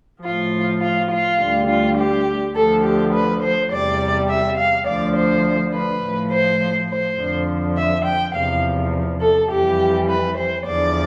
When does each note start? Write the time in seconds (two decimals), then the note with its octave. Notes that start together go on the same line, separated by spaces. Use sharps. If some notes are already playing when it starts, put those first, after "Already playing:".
0.23 A2 F3 F4
0.81 F4
1.11 F4
1.39 D2 D3 G3
1.68 F4
1.97 G4
2.55 D2 D3 F3 A4
2.84 G4
3.13 B4
3.43 C5
3.71 E2 C3 G3 D5
4.29 E5
4.57 F5
4.87 D2 D3 F3 D5
5.15 C5
5.74 B4
6.03 A2 F3
6.31 C5
6.89 C5
7.18 F2 D3 F3
7.77 E5
8.05 G5
8.34 E2 C3 F3 F5
9.21 A4
9.50 F2 E3 G3 G4
10.08 B4
10.37 C5
10.66 E2 D3 F3 D5